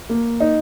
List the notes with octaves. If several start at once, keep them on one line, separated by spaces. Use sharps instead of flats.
A#3
D#4